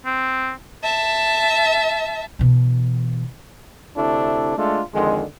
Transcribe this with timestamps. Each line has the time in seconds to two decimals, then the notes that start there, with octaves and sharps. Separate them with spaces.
0.06 C4
0.84 E5 A5
2.39 B2 E3
3.96 D2 C3 A3 D4 E4
4.58 G#3 A3 D4 F4 A4
4.94 F2 D3 D#3 G#3